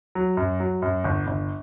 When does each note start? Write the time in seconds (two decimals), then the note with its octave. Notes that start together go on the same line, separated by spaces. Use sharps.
0.15 F#3
0.37 F#2
0.60 F#3
0.82 F#2
1.04 G1
1.27 G1